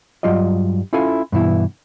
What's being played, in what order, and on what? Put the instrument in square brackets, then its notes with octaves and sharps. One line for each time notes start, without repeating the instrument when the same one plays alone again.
[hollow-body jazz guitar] G2 F#3 F4 D5 D#5
C#4 E4 F4 A4 F5 G#5
G2 B2 E3 E4